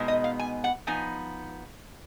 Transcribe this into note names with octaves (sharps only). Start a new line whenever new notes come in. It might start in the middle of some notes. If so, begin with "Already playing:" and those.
Already playing: B2 G#3 B3 D#4
D#5
F5
G#5
F#5
F3 B3 D#4 G#5